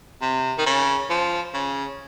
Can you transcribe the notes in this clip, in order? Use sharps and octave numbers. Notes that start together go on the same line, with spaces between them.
C3
D#3
C#3
F3
C#3